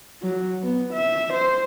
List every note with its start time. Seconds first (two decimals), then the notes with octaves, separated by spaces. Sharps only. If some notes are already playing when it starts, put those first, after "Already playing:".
0.23 F#3
0.63 B3
0.93 E5
1.33 C5